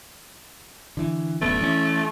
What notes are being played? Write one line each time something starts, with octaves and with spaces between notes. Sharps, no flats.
D3 E3
D1 F#2 A3 B3
E3 C#4